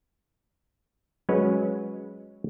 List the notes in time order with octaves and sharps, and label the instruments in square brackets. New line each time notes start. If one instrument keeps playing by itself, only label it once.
[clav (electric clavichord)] F#3 G#3 C#4 B4 C#5